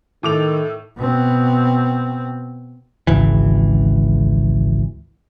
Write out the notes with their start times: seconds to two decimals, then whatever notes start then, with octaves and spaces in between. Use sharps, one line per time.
0.23 A2 D#3 A4 D6 F7
0.97 B2 C4
3.07 G#1 C#2 E3